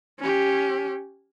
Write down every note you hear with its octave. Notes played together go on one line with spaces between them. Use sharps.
C#4 G4